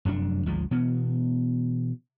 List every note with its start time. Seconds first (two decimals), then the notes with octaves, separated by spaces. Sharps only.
0.05 F1 F#2 A3 D4
0.46 G#1 D2 F3 G#3
0.71 B2 E3 B3